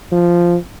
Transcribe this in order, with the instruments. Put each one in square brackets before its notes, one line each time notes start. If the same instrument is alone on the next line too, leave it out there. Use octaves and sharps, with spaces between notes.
[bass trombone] F3